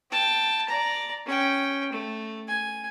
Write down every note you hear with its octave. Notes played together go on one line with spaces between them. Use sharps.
G5 A5
D5 A#5
C#4 G5
A3
G#5